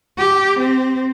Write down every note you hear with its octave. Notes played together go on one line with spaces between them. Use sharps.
G4
C4